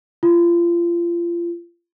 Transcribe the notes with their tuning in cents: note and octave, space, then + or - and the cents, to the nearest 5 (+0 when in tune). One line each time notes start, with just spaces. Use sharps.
F4 -30